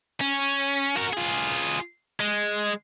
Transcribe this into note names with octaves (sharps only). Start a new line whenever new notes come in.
C#4
F#4 A#4
F4 G#4
G#3